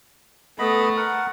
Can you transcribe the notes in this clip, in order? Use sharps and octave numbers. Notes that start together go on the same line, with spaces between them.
A3 B3 D#5 B5
A#4 F#5